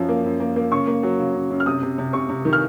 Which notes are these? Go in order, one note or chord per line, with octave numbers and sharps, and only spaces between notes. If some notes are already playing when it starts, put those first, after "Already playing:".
Already playing: F#2 F3
A#3
F#2
A#3
A#3
C#3 C#6
A#3
F#3
C#3
C#3
F#2
F6
C3 D#6
C3
C3
C3 C#6
C3
D#3
F6